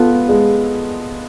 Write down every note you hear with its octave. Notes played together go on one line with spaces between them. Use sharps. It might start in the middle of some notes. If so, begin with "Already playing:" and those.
Already playing: B3 F4 A4
G#3